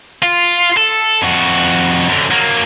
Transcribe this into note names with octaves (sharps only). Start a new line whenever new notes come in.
F4
A4
F2 F#4
F#2 D3
F#3 A#3